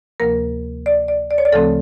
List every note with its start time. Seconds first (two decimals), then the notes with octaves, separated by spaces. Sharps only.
0.20 D2 C3 F3 A#3 A#4
0.86 D5
1.08 D5
1.31 D5
1.38 C#5
1.45 D5
1.52 D2 C#3 F3 A3 C4 A4